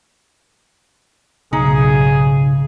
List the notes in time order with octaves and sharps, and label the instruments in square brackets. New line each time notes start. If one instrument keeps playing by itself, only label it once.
[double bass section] B1 G#2 [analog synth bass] C#3 [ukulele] D#4 [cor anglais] G#4